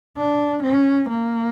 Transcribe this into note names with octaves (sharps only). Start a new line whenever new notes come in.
D4
C#4
A#3